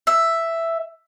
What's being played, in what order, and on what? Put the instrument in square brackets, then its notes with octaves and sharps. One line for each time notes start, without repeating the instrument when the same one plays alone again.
[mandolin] E5